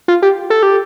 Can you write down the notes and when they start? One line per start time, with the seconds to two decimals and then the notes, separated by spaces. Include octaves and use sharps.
0.08 F4
0.22 G4
0.50 A4
0.63 G4